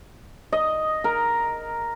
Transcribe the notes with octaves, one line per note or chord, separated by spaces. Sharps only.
D#5
A#4